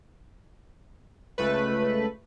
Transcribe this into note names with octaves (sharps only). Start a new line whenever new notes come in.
C#2 A3 B4